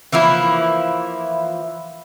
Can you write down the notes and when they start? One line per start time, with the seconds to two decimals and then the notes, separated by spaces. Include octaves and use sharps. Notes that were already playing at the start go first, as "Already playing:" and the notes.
0.12 E3 F3 A#3 E4